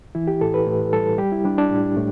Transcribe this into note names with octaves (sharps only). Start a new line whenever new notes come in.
E3 E4
G4
A2 A4
B4
A2
G3 A4
G3 G4
E4
G3 D4
D4
A2
A2 A3